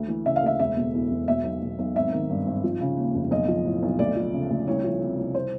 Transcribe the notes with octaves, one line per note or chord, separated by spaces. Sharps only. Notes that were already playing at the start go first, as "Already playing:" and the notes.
Already playing: D2
E3
C#3 E5
F5
D2 E5
E1 E5
B2
E2
E1
B2 E5
B1
B2
B1
G#1 E5
D#3
G2
G#1
F3
C#3
D#2
F1
B1 D#5
F3
A2
B1
D2 D5
F3
C#3
D2
C2 C#5
F3
C3
C2
C5